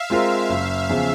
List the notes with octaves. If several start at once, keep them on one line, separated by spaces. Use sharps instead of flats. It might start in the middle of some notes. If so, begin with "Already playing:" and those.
Already playing: E5 F5
G#3 C4 F4 A#4
F#1
E2 C#3 F3